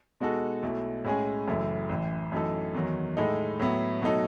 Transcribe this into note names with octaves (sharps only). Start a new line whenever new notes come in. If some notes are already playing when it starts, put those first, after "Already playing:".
B2 G#3 D#4 F#4 A4
B1 B2 A3 E4
A2 G#3 C#4 G#4
F#1 F#2 E3 A3 E4
A1 A2 E3
F#2 E3 A3 D#4 A4
E2 D#3 F#3
A2 G#3 D#4 A4
A2 F#3 B3 E4
B2 F#3 A3 D#4 A4